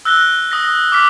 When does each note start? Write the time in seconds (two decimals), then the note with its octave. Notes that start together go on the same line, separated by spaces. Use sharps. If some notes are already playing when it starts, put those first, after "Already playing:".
0.05 E6 F#6 A#6 G7
0.52 D#6 A#6
0.92 D6 F6 B6